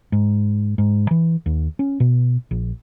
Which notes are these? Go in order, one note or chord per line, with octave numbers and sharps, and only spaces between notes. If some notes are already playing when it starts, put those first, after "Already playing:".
G#2
G#2
E3
D#2
C#4
B2
A#1